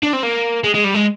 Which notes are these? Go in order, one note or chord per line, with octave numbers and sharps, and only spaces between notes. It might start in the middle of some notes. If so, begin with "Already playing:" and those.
D4
C4
A#3
G#3
G#3
G3
G#3